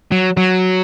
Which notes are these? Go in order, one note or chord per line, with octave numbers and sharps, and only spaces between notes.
F#3
F#3